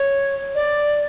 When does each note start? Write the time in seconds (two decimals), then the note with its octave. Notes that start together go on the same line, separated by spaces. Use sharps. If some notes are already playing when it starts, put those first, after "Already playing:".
Already playing: C#5
0.55 D5